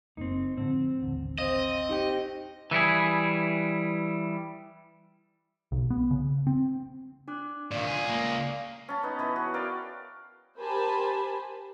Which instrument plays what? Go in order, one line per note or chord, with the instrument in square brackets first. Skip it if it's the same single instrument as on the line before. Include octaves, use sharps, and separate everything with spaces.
[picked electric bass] F#1 A#3 [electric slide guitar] C4 D#4
[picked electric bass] A2 D3 F3 [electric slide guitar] C4
[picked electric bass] D#1 A1 D3
[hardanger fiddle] C4 [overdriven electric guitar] D#5 [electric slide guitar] F5
[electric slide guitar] D#4 G4 G5
[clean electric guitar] E3 G3 E4 G#4
[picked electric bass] B1
B3
C#3
C4
[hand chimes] D4 D6 F#6
[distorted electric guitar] A#2 D#3 [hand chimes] D5 F5
[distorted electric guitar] C#2 G#4
[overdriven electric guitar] A#3
[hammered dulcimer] C#4 A5
B3 D#4
E3 B3 G#4
F#4
A#4 D5 F5 G5
[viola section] G4 A#4 C5 G#5 A5 B5